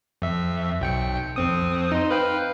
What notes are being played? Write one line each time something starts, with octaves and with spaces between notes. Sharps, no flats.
F2 E5
B1 G5 C#7
F2 C4 D#6
D#4 C5
B4 F5 G5